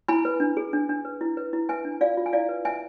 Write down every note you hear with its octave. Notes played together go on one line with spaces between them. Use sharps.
E4 G#5 B5
B4
D4
G#4
D4
D4
B4
E4
B4
E4
B4 E5 G#5
D4
F4 D5 F5
F4
G#5
E4 D5 F5
B4
B4 E5 G#5